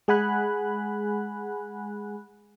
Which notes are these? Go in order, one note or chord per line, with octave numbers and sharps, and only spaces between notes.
G#3 G#4 F#5 G#5 B5 F#6